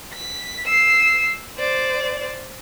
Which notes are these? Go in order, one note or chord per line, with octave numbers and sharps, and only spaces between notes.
B6
E6 C7
C5 D5